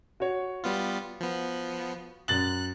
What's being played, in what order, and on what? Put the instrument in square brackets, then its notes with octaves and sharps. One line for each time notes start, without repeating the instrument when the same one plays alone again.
[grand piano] F#4 C#5
[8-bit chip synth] G3 B3 F4
F3 B3
[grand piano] F#2 A6 F#7 [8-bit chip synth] F#6